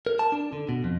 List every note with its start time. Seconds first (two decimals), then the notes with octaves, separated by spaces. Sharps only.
0.07 A#4
0.19 A5
0.32 D4
0.53 D3
0.69 B2
0.84 F2